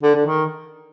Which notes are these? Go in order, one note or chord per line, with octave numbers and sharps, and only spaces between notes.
D3
D3
D#3